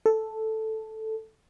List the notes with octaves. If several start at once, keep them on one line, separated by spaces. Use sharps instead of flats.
A4